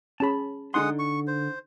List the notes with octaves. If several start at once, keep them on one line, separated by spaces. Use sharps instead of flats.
C#4 G#4 A5 B5
D3 G#3 D#4 F#5 C6 D#6
C#6
C5